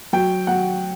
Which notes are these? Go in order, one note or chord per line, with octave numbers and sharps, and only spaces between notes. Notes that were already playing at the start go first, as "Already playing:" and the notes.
F#3 G5
F#3 F#5